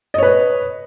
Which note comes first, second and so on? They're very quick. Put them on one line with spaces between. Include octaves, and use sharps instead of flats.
D#5 C#5 B4